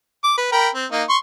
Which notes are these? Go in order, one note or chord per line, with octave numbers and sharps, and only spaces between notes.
D6
B4
A#4 G5 B5
C4
A#3 D#4
C6 C#6